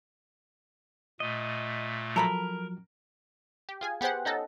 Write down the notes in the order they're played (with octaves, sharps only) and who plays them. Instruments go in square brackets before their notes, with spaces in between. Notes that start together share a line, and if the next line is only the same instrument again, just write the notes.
[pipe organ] A#2 A3 [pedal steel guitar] D#5
[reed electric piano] F3 F#3 [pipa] A4 A#5 B5 [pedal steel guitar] A#4
[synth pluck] G4
F4 G#4 G#5
B3 G4 G#4 C5 F#5
C#4 D#4 F#4 A4 D#5